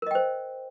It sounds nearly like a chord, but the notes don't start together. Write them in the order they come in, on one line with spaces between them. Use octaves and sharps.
A#4 D#5 G5 C5